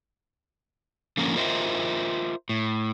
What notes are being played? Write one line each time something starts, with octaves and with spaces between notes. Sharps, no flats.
D3 F3 A#3 C#4 A#4
F4 A#4 C5 D#5 E5
A2